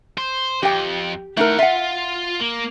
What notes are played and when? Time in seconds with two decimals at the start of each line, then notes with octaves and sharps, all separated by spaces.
0.18 C5
0.63 F2 G4 G5
1.37 A3 D#4 E4 A#4 F#5
1.59 F4 E5 F#5
2.40 A#3